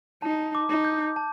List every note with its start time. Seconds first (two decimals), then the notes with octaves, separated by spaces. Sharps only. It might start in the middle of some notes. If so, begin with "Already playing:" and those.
0.22 D#4 A5
0.55 D6
0.69 D#4
0.85 G6
1.16 A5